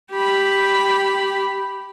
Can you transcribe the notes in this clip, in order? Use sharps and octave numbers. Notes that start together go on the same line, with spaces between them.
G4 B5